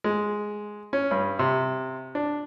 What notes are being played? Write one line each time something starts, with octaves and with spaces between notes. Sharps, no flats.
G#3
C#4
G2
C3
D4